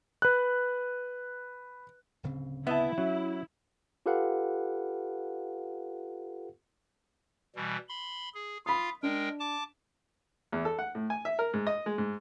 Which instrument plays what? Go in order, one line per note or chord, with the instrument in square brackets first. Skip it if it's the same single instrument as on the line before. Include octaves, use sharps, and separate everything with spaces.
[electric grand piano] B4 F#6
[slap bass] D1 C#3 C4
[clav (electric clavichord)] B3 D#5 A5 [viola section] E4 [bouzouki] E5
[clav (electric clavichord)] F#3 [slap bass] C#4
[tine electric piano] F4 G4 A4 B4 F5 F#5
[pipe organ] B2 E3 G3
B5 C6
G#4
[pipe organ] F4 F5 [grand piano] B5 D#6
[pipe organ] G#3 A#4 G5 [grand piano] D4
[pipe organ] A5 D6
[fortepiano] E2
A4
F#5
A2
G#5
E5
A#4
G#2
D#5
G#3
G#2